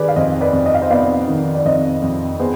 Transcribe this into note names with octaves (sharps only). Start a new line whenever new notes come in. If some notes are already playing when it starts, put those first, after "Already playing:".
Already playing: D#3 G4 G#4 B4 D5
F5
F2 C5 D#5
B4 D5
F2
D#5
F5
C5 D#5
B3 D5 F5
D#3
D5
F2 C5 D#5
F2
B3 G#4 C5